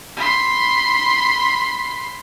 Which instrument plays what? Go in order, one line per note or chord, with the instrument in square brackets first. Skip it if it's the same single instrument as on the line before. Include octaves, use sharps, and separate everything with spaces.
[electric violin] B5 C6